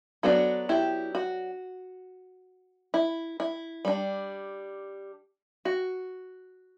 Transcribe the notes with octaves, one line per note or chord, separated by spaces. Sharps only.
F#3 B3 D4 F#4 A4
E4 G4
F#4
E4
E4
G3 D4
F#4